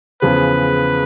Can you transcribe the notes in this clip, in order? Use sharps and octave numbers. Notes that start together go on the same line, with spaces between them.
E2 C#3 F3 B4